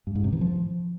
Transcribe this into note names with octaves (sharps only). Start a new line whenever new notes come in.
G2
G#2
C3
E3
F3